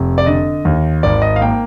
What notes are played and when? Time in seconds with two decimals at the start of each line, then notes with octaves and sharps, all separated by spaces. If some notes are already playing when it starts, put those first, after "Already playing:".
Already playing: F1
0.18 D5
0.26 D3 D#5
0.65 D#2
1.03 G#1 D5
1.22 D#5
1.36 F5
1.41 A#3 G5